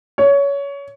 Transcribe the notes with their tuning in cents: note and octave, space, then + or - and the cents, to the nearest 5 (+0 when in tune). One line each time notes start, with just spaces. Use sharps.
C#5 +20